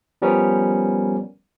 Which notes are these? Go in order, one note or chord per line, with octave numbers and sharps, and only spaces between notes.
F3 G3 B3 C#4 A#4